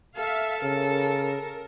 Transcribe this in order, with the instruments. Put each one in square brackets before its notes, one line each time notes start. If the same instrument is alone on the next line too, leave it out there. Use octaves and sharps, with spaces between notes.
[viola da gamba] A4 [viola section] E5 F5
[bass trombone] C#3 [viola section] A#4